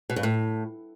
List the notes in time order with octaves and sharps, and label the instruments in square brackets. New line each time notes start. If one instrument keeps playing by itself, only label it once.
[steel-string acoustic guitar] B2
G2
A2